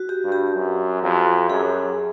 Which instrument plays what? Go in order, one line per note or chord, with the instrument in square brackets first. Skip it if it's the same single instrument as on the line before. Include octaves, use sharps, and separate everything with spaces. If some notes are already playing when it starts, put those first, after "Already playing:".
Already playing: [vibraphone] F#4
G4
[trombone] G2
[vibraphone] G4
[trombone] F#2
F2
[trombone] F#2 [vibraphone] G#4